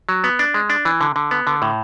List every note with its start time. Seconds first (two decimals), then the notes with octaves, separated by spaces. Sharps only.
0.09 F#3
0.24 B3
0.39 D4
0.54 G#3
0.70 D4
0.85 E3
1.01 D3
1.16 D3
1.31 B3
1.47 D3
1.62 A2